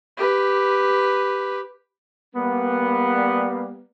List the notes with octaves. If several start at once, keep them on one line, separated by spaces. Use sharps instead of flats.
G4 B4
G3 A#3 B3